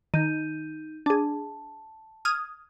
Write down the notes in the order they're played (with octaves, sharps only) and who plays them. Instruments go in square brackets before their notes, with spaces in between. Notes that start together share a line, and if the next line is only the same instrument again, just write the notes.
[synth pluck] D#3 [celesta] D#4 G6 D#7
[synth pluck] D4 G#4 [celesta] A5
[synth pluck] D#6 F6 G#6